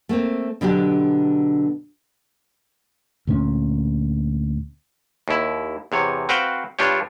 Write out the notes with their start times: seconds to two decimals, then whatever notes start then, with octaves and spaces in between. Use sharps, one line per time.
0.09 A3 A#3 C4
0.61 B2 D3 F#3 D4 G4
3.27 D2 A#2 G#3 C#4
5.28 D#2 E4
5.92 E2 C3 C#5
6.29 C4 F#4 B4 C5 F5 G5
6.79 G2 D4 F4 G4 C#5